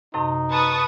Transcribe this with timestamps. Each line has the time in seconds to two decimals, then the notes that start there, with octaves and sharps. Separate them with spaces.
0.14 F#2 A2 C3 D#4
0.51 B4 A5 C#6 D#6